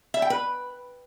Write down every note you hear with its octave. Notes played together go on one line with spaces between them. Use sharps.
E5
G5
B4